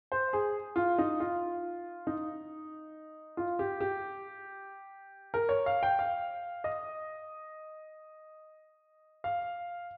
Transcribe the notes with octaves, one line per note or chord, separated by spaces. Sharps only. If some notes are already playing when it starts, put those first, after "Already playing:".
C5
G#4
F4
D#4
F4
D#4
F4
G4
G4
A#4
C#5
F5
G5
F5
D#5
F5